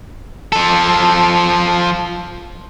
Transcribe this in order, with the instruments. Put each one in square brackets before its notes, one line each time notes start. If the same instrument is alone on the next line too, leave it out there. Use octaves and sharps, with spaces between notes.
[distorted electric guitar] F3 A4